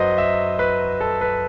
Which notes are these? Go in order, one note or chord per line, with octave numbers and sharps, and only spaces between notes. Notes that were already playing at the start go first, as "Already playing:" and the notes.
Already playing: F#2 F#3 B4 C5 D#5
E5
B4
A4
B4